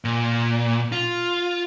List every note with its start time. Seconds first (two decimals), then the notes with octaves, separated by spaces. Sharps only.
0.04 A#2
0.92 F4